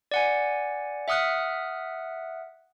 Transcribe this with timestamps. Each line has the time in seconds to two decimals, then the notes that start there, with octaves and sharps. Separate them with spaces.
0.11 D5 F#5 G#5
1.08 E5 F#5 D#6 F6 F#6